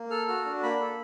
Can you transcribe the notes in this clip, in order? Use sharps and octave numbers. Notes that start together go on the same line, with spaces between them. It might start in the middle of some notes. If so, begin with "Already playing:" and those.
Already playing: A#3
A4 F6
F#4 F6
D4
A#3 B5
A4